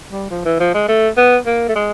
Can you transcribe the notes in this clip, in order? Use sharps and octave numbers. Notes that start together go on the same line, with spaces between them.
G3
F3
E3
F3
G#3
A3
B3
A#3
A3
G#3